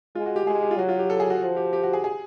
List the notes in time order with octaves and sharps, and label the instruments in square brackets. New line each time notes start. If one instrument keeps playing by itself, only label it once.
[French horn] G#3 [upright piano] F4
[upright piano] F#4
G4
[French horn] G#3 [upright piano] G#4
[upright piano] G4
F4
[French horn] F#3 [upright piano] F#4
[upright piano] F4
G4
A4
G#4
F#4
[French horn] F3 [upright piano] F#4
[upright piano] G4
G4
F#4
G#4
G#4